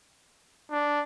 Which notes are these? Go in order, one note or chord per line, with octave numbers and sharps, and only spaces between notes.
D4